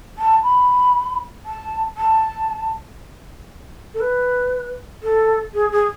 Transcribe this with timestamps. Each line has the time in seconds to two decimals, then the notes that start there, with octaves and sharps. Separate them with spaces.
0.18 A5
0.43 B5
1.45 A5
1.97 A5
3.94 A4
4.00 B4
5.03 A4
5.54 G#4
5.72 G#4